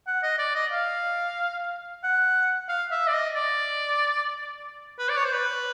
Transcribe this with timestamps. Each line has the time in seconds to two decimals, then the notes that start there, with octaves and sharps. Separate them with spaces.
0.07 F#5
0.23 D#5
0.39 D5
0.55 D#5
0.72 F5
2.04 F#5
2.69 F5
2.91 E5
3.08 D5
3.14 D#5
3.35 D5
4.99 B4
5.09 D5
5.17 C#5
5.24 C5
5.32 B4